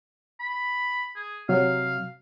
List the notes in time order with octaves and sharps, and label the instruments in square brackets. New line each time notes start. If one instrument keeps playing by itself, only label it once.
[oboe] B5
G#4
[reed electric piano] C3 F#3 [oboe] F5